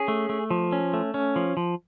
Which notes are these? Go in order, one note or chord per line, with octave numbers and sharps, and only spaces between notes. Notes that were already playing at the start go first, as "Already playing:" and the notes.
Already playing: C#4 G#4
A3
A3
F3
C#4
A3
C#4
F3
F3